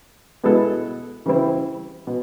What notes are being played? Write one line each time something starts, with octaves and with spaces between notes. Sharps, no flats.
B2 G#3 B3 E4 A4
C#3 E3 G3 C4 E4
B2